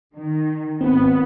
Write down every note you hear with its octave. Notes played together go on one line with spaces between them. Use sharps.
D#3
G#1 B3 C4